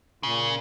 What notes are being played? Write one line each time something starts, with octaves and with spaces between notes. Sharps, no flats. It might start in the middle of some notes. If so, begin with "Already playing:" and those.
A#2 C#3